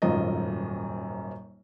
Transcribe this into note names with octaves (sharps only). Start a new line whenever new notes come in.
D#1 G#1 F#2 F4 D#5